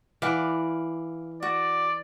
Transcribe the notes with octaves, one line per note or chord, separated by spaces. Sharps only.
E3 D5 F5 F#5
F#4 D5